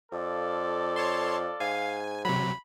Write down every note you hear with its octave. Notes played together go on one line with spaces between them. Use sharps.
F2 F4 A4 D5
C#5 A5 C6
G#2 F5 G#5
C3 F#3 B5